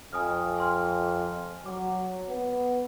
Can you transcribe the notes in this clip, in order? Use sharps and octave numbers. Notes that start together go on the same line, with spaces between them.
F2 G#5 D#6 F6
G#5 C6 F6
F#3 D6
B3